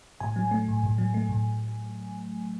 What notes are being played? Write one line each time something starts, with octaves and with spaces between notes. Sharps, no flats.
A2 G#5
F#3
A3
A2
A2
F#3
A3
A2